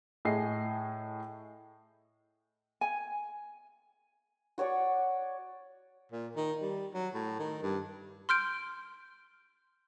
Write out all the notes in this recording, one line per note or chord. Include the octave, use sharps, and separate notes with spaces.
A2 G#4 D#5 C7
G#5
F#4 C#5 D5 C#6
A#2
D#3
G3
F#3
A2
D#3
G2
C6 F6 G6 D7